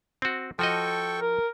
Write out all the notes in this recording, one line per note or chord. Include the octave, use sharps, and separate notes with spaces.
C4 F#4
F3 F#4 A4 D#5 G5 C#6
A#4